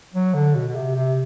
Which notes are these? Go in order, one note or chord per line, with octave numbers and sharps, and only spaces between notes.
F#3
D3
B2
B2
C3
C3